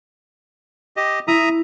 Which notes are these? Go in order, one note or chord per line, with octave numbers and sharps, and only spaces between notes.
G4 D#5
E4 E5 A#5 D#6